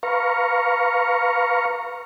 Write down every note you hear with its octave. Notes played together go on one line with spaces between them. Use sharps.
B4 F5 A#5 C#6